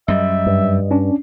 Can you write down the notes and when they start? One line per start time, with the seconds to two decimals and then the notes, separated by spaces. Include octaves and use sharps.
0.08 F#2 G3 D#5 E5
0.46 G2
0.91 C#4 D4